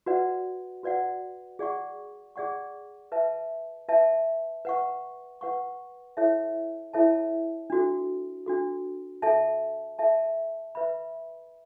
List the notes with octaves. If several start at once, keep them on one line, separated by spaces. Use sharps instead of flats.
F#4 B4 D5 F#5
F#4 B4 D5 F#5
G#4 D5 F#5 C#6
G#4 D5 F#5 C#6
B4 E5 A5
B4 E5 A5
B4 F#5 C#6
B4 F#5 C#6
E4 A4 C#5 E5 A5
E4 A4 C#5 E5 A5
D4 F#4 A4
D4 F#4 A4
A4 E5 A5
A4 E5 A5
B4 E5 B5